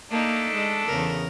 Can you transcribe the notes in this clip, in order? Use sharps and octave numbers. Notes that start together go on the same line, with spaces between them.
A3 A#3 D4 D#4
G#3
E2 C#3 A#4